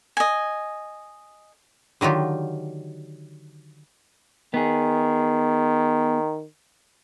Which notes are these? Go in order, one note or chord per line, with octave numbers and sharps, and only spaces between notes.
D#5 G#5
D3 D#3 F#3 F4 G4
D#3 B3 G#4